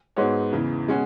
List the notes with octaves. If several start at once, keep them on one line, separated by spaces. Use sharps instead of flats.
G#2 G#3 B3 F#4 C#5
E2 C#3 E3
B2 G#3 C#4 F#4